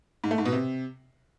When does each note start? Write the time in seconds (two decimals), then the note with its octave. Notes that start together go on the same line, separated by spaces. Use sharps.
0.24 G#2
0.31 A3
0.38 G#2
0.45 B2
0.53 C3